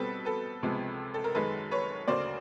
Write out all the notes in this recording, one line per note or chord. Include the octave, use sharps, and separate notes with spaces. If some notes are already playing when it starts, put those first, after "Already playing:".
Already playing: B2 G3 C4 A4 B4
A4 B4
C#2 C3 F3 G#3 B3
A4
A#4
F#2 D#3 G#3 A4 B4
B4 C#5
D2 C#3 F#3 A#3 C5 D5